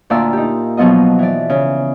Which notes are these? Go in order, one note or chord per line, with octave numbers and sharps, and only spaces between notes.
D2 A#2 F4 D5 A#5 E6
D#4 G4
B2 F3 F#3 B3 F4 D#5
E3 D5
C#3